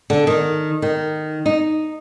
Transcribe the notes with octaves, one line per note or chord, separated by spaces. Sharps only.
D3
D#3
D#3
D#4